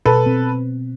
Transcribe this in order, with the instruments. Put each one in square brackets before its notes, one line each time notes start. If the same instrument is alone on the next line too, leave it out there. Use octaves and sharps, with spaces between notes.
[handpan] B2 [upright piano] A4 B4
[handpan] C4